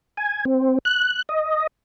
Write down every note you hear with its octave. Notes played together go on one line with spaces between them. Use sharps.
G#5
C4
F#6
D#5